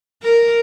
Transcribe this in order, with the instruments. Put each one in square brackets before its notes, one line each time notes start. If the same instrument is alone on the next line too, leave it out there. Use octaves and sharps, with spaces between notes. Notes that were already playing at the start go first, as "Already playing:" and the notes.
[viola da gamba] A#4